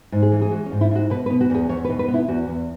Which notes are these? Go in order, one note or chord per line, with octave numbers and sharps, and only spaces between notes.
G#2
G#4
E3
G#4
G#3 F#4
C#4
G#2
E4
G#2 F#4
B2 B4
B4
B3
F#4
E2 G#4
E2 C#5
B4
B2
B4
B3
E4
E2 F#4
E2